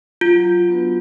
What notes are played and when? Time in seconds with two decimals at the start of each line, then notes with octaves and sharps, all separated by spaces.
0.21 F#3 F4
0.69 B3 D4 F#4 B4